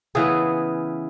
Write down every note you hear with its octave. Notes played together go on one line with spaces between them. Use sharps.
C#3 E3 B3 G#4